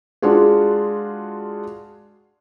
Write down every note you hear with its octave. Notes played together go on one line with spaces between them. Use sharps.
G#3 D4 F4 F#4 G#4